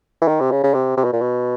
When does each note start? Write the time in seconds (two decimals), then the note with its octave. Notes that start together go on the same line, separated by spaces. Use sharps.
0.22 E3
0.28 D#3
0.41 C3
0.51 C#3
0.63 C#3
0.74 C3
0.97 C3
1.04 B2
1.13 A#2
1.21 B2